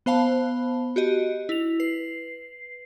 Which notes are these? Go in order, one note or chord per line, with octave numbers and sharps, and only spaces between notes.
B3 C5 F5 A5 B5
F#4 G4 D#5
E4 F7
B4 C7